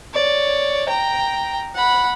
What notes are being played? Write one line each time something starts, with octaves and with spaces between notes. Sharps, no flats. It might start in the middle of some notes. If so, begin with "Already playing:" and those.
C#5 D5
G5 A#5
F#5 B5